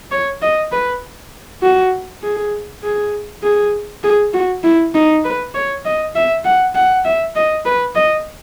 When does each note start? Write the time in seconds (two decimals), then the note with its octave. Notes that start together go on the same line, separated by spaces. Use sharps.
0.11 C#5
0.41 D#5
0.72 B4
1.62 F#4
2.22 G#4
2.83 G#4
3.42 G#4
4.03 G#4
4.33 F#4
4.63 E4
4.94 D#4
5.24 B4
5.54 C#5
5.84 D#5
6.15 E5
6.44 F#5
6.75 F#5
7.05 E5
7.35 D#5
7.65 B4
7.95 D#5